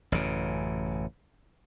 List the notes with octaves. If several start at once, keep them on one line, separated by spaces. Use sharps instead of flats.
A1 F#2 C#3